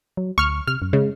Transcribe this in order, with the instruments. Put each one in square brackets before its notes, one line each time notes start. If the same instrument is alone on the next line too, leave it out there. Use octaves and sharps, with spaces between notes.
[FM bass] F#3
[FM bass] D2 [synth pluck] C#6 F6
[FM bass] C3 [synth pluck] F6
[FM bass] F#2
[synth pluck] C#3 [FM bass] G#3